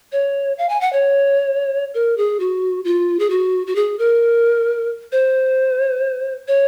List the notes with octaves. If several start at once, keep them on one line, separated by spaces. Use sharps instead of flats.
C#5
F5
G#5
F#5
C#5
A#4
G#4
F#4
F4
G#4
F#4
F#4
G#4
A#4
C5
C#5